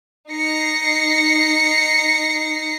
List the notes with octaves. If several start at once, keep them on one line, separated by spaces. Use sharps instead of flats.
D#4 A#6 C7 C#7